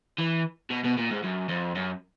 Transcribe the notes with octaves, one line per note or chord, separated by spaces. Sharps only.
E3
B2
B2
A#2
G#2
F#2
F2
F#2